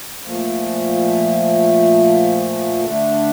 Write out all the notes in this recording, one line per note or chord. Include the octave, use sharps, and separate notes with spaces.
A#2 F3 A3
D3 A3 D4